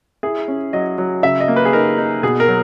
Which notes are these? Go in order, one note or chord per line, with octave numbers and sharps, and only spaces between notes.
E4 G#4
C#4
F#3 D#5
F#3
C#3 E5
D#5
A#3
B4
G#4
D#4 A#4
D#4
B2 G#4
A#4
F#3